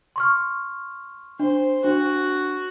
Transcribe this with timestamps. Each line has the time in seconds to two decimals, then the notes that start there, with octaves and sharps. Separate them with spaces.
0.16 C6 C#6 F6
1.40 D4 C5
1.84 D4 F#4